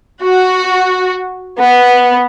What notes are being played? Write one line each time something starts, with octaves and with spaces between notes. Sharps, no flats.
F#4
B3